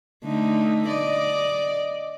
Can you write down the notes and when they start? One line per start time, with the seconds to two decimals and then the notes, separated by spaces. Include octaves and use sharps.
0.25 D3 A3 D#4
0.88 D5 D#5